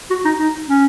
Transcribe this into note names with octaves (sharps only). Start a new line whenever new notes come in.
F#4
D#4
D#4
C#4